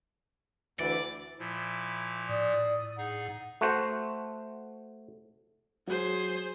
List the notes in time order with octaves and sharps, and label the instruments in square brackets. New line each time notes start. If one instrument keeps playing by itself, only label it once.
[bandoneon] D2 E3 [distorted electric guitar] D5
[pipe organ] A#2 F3 [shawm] E4
[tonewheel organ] A2 [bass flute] D5 [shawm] D#6
[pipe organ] D#4 G#4 [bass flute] F#5
[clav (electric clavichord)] A3 F#4 C5
[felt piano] F#3 [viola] G#4 C5